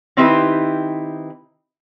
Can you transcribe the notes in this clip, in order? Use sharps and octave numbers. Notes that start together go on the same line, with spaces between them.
D#3 C4 D#4 E4 G4 B4